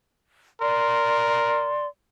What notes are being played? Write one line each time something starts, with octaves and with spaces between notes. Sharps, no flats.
A#4 D5 C6